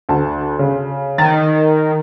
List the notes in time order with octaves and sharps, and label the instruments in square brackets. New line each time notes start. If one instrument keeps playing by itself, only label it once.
[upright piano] D2 A5
C#3
[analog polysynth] D#3 [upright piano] A6